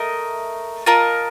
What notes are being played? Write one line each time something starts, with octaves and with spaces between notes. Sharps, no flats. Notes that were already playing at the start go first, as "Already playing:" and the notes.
Already playing: A3 A#4 D#5
F4 A#4 D#5 A5